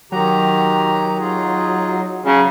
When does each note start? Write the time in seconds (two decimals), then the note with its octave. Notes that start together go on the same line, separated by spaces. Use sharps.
0.12 D#3 F#3 G4 A#5
1.20 D#4 F4 G#4
2.26 C#3 F#3